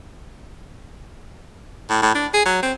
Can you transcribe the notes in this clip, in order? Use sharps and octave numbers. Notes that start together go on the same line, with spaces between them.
A2
A2
D4
G#4
F#3
C4